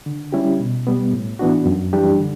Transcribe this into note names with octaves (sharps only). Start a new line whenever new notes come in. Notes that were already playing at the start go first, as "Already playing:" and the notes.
D3
G3 C#4 E4 G4
B2
G3 B3
A2
E3 B3 D4 F#4
F#2
E3 G3 D4 G4
D3